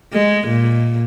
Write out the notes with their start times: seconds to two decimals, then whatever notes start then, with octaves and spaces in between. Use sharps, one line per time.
0.13 G#3
0.48 A#2